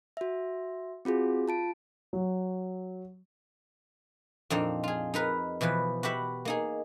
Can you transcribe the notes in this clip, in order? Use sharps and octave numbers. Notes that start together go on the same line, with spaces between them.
F#4 E5
C4 F4 F#4 G#4
F4 A5 D7
F#3
F2 A#2 C4 D4 D#4
F4 G#4
D#4 A#4 B4
B2 E3 F3 B4
F#4 G4 B4 E5 F#5
A#3 D#4 G#4